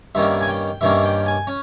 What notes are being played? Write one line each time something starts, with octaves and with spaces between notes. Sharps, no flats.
G2 D#3 A#3 C#4 E5
G#5
G5
G2 D#3 A#3 C#4 E5
G5
G#5
C#4